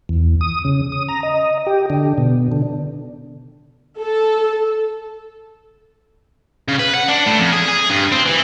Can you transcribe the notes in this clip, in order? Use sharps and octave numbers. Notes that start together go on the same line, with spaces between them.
E2
D#6
C#3
D#6
A#5
D#5
G4
D3
B2
D3
A4
C#3
B4
F#5
D4
A2
F2
G#4
G#4
G2
C4
E3